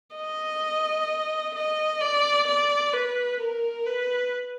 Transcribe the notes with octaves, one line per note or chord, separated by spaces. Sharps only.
D#5
D#5
D5
D5
B4
A#4
B4